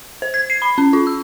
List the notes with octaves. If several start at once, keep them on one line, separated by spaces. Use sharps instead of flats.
C5
G#6
C7
B5
C#4
F4
E6